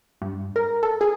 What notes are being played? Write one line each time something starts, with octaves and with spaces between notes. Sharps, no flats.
G2
A#4
A4
G#4